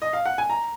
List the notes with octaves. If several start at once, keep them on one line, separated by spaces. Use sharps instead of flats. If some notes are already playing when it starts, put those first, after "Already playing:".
D#5
F5
F#5
G#5
A#5